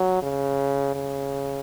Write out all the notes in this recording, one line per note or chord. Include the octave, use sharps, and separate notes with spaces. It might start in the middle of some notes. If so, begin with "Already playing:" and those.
Already playing: F#3
C#3
C#3